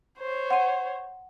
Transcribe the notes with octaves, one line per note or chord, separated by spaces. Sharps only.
C5 C#5
F#5 C6 D#7